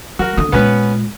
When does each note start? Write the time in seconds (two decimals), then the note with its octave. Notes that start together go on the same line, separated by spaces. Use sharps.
0.19 F#3 F#4 A#4
0.37 D3 A#3 D#6
0.52 A#2 G#3 B3 C#4 B4